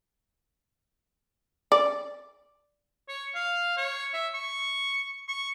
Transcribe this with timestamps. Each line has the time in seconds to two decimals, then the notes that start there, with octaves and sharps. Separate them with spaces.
1.72 D5
3.09 C#5
3.35 F5
3.77 C#5
4.13 E5
4.34 C#6
5.28 C#6